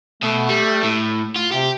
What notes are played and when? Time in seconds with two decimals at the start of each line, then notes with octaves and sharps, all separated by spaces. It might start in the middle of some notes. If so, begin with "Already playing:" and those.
0.23 B2 A3
0.49 G3
0.83 A2
1.36 F4
1.52 C3 G4